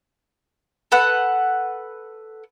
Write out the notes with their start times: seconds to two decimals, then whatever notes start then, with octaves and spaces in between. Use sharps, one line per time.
0.92 A4 B4 F#5